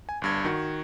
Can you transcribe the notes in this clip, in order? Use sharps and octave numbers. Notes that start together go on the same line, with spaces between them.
G#5
G1 G2 G#6
D#3 F#4